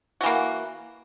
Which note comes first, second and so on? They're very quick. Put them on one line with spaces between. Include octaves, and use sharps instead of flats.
F#4 E3 A#3